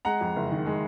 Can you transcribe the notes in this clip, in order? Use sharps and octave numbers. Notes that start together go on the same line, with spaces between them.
G#3 F#5 A#5
F2
F#1
D#3
G#3